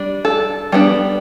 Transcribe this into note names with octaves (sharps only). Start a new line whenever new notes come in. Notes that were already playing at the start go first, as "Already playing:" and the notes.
Already playing: G3 D4
A4
G3 B3 D4